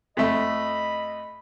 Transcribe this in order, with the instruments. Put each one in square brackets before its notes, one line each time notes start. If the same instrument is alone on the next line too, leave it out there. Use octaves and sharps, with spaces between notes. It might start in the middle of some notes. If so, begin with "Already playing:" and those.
[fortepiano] F2 A3 [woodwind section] D#5 B5